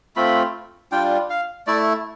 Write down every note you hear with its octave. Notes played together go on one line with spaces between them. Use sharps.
A3 C4 F4 B5
G3 D4 F4 G5
F5
A3 E4 D5